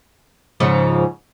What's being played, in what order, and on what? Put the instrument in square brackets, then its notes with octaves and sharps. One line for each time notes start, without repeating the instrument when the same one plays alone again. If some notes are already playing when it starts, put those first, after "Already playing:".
[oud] G#2 C#3 F3